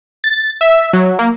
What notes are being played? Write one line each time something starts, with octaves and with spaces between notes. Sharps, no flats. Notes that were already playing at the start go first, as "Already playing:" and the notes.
A6
E5
F#3
A#3